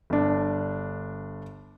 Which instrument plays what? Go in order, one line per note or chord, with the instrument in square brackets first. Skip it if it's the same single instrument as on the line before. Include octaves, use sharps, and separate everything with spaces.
[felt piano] G1 D4